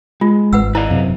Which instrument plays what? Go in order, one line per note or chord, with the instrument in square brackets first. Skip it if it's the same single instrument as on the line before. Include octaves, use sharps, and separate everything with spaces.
[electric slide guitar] G#3 [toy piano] F4
[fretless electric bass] G#1 [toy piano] B4 F#5 E6
[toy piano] E4 D5 [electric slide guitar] B4 D#5 F5
[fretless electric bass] F#2 C3